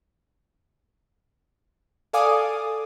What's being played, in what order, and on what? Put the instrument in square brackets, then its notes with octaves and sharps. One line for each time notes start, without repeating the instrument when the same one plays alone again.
[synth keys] A4 D5 F5 G#5 D6 D#6